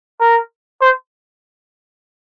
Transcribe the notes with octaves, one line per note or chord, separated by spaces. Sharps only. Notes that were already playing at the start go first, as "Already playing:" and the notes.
A#4
C5